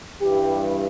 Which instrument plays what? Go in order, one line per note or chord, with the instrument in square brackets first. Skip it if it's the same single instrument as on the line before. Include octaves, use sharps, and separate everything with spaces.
[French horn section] G2 E3 G3 G4